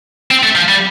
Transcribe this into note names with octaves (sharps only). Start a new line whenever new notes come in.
C4
A3
F3
G3